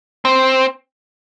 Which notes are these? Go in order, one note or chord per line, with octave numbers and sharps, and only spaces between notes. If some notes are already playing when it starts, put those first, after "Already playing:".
C4